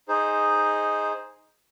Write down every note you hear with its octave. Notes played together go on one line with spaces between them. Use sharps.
D#4 G#4 C5